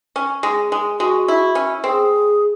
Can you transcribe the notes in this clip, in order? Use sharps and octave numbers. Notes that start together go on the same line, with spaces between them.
C#4
G#3
G#3
G#3 F#4
E4
C#4
C4 G#4